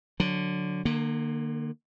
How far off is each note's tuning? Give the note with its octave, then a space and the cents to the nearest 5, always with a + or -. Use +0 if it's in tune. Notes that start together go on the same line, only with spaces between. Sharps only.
D3 +0 F#3 -15
D3 +45 A#3 +0